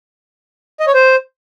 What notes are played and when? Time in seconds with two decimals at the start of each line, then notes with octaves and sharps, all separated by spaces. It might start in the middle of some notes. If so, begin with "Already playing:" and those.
0.80 D#5
0.87 C#5
0.94 C5